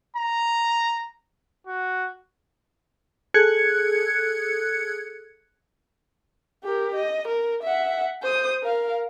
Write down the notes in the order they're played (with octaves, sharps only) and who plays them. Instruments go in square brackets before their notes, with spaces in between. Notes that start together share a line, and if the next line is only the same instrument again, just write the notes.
[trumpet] A#5
F#4
[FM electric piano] G#4 A4 F#6 G#6 C#7
[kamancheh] G4 A#4
D#5
A#4
E5 F#5
C5 D#6
A#4 F5